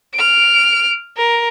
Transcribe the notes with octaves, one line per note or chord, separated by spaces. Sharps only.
F6 D7
A#4